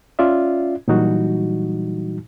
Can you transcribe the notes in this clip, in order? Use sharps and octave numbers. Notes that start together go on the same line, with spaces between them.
C#4 F4 D5 E5
A#2 E3 F#3 G3 D#4 F#4